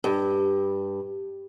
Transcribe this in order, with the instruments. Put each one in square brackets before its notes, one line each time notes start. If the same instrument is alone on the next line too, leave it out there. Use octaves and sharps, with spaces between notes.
[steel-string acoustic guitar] G2